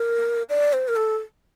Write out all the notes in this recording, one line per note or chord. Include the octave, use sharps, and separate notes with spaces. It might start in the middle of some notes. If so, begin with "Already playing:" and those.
Already playing: A#4
D5
C5
A#4
A4